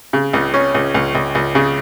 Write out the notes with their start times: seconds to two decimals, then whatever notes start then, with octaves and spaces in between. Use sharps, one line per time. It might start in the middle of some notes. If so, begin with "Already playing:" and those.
0.13 C#3
0.33 C#2
0.54 C#4
0.74 C#2
0.94 C#2
1.15 C#2
1.35 C#2
1.55 C#3